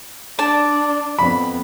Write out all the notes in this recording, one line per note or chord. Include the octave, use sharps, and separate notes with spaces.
D4 D5 A5
F2 B3 B5